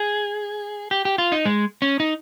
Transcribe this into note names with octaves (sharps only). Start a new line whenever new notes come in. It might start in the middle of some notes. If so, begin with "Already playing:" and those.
Already playing: G#4
G4
G4
F4
D#4
G#3
C#4
D#4